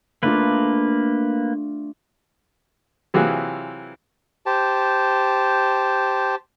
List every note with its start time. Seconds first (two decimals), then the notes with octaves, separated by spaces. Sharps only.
0.23 A3 A#3 D4 F4 B4
3.14 C3 E3 F#3 F4 F#4 G#4
4.46 G4 C5 A5